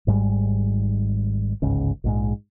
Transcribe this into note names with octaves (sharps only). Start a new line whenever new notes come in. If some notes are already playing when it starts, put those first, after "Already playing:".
G#1 G#2 G3 G#3
G1 C#2 G#2 C#3
A#1 G#2 G#3